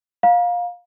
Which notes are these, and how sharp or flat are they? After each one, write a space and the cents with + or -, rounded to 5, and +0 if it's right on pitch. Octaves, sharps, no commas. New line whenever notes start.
F5 +20 A#5 +35